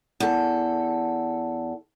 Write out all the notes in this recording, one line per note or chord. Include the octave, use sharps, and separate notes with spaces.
E2 A4